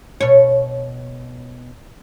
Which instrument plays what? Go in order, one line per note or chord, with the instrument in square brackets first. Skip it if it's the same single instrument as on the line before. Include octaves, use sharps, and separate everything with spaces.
[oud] B2 C#5